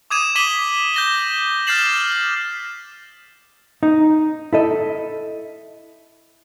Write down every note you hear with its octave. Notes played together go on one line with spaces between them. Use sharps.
D6 D#6 G#6 D#7 E7
D6 B6 D#7 F#7 G7
G6 A#6 G7
F6 G6 A6 C7 E7 F#7
D#4
E4 A4 D#5